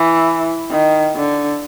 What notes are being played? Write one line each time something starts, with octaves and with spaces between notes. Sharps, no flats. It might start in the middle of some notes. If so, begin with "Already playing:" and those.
Already playing: E3
D#3
D3